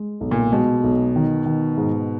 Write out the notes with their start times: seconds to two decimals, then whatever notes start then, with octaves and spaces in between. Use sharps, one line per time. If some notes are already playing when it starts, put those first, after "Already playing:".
Already playing: G#3
0.21 B1
0.31 A#2
0.52 B2 G#3
0.84 B1
1.16 D#3
1.46 D#3
1.77 G#2